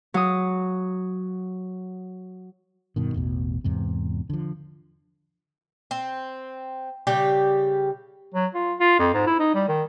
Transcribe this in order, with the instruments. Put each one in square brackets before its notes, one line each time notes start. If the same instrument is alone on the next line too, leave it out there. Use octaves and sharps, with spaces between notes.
[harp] F#3 D#6
[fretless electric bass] G2 B2 D#3
A1 E2 B2
E2 G#2 C3
D3 F3
[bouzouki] C4
C#3 G3 G4
[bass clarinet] F#3
F4
F4
F2
G#2
E4
D#4
G3
D#3